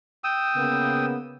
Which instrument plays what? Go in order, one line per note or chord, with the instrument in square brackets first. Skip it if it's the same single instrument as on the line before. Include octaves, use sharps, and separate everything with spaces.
[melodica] G5 D#6 E6
[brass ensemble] C#3 A#3 B3